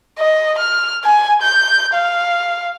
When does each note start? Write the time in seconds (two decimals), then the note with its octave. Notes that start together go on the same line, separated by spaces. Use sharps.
0.18 D#5
0.58 F6
1.04 G#5
1.42 G6
1.94 F5